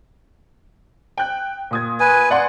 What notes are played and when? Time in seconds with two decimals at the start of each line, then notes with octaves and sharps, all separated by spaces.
1.18 G5 F#6
1.71 A#2 D#6 G#6
2.00 B4 G#5
2.30 D5 F#5 C6